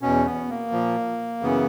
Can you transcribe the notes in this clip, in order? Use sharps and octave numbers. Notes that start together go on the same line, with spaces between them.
E2 B2 C#4
B3
A#3
A#2 F3
F#2 C#3 E3 B3